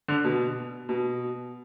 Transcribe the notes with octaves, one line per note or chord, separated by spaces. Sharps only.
D3
B2
B2